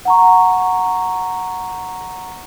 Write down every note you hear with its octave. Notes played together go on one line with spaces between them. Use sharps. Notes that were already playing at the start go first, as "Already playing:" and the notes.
F#5 A#5 C#6